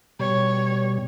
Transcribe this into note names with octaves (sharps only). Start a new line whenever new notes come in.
B2 G3 C#5